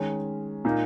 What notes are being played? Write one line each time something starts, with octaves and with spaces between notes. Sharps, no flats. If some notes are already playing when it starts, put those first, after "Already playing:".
Already playing: D#3 G#3 C#4
A#2 A#3 D#4